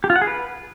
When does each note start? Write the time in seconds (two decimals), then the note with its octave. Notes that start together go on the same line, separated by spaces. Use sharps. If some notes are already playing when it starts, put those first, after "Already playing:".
0.04 G4
0.10 F4
0.16 F#5
0.21 G#4
0.27 B4